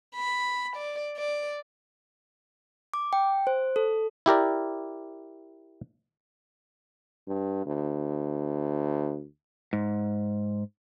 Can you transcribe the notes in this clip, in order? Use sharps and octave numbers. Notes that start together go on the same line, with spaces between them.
B5
D5
D5
D6
G5
C5
A4
E4 G4 A#4 D5
G2
D2
G#2